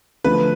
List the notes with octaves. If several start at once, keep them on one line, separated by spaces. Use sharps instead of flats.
D3 F3 A3 D4 B4